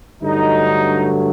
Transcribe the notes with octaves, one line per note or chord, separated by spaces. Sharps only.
G2 D3 F#3 A3 D#4